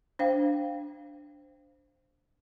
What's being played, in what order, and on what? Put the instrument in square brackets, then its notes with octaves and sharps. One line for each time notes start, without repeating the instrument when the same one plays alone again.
[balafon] D4 C5 F5 G5